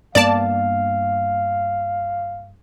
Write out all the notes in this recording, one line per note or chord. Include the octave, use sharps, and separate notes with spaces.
G2 A#3 B3 D5 F5 A5